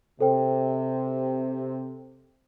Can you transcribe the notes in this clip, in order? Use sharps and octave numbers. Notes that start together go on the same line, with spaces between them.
C3 A4 C5 G5